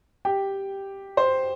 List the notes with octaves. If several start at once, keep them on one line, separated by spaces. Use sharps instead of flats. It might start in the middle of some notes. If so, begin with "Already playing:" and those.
G4 G5
C5 C6